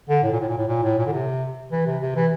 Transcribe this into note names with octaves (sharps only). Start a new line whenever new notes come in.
D3
A2
A#2
A2
A#2
A2
A#2
A2
A#2
D3
C3
E3
C3
C3
E3